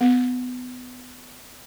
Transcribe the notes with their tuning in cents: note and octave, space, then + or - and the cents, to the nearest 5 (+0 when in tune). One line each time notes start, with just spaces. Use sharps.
B3 +25